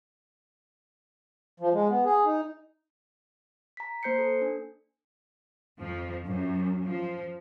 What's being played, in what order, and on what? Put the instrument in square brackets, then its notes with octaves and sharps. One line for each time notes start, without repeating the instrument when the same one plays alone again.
[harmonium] F3
G#3
B3
G#4
D#4
[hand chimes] A#5 B6
A#3 C5 G6 C7 C#7
A4
D4
[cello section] F2 F3
F#2
F3